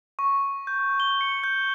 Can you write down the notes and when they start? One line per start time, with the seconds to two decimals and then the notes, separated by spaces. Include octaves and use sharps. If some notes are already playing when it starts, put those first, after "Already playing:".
0.19 C#6
0.67 G6
1.00 G7
1.21 C#7
1.44 G6